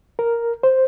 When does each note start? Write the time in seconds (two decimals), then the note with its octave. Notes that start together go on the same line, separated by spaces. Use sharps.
0.19 A#4
0.63 C5